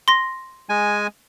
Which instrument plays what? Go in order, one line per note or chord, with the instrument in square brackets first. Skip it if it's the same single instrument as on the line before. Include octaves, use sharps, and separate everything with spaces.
[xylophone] C6 A#6
[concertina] G#3 G#5